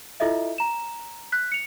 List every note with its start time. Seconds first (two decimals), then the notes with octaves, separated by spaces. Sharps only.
0.20 E4 F4 A4 D#5 E5
0.58 A#5 E7
1.32 F#6 B6
1.52 C#7 F7